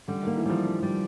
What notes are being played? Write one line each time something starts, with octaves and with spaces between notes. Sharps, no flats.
D3 G3
D#3 A#3
E3
F3 G3
D4
G3